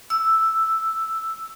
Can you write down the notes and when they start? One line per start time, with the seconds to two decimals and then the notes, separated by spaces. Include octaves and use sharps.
0.10 E6